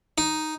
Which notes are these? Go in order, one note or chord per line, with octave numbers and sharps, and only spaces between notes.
D#4